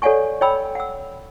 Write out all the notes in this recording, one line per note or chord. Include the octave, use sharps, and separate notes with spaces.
A4 C#5 D5 F#5 G#5 C#6
C#5 D#5 G5 B5 E6
F#5 E6